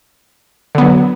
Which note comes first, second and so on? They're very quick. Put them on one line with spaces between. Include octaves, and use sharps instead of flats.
D3 B3 F#3